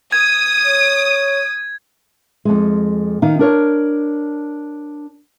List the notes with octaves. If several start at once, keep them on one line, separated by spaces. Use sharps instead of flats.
D#6 G#6
C#5
F2 G#3
D#3 D#4 F5
D4 A#4 C#5